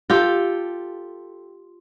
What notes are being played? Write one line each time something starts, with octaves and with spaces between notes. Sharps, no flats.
F4 G4 A4